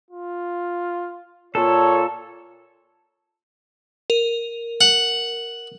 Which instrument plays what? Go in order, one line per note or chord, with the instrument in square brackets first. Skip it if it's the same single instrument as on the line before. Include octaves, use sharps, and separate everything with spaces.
[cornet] F4
[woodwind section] A#2 [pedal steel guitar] A4 [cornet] C#5
[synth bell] A#4
[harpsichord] F#5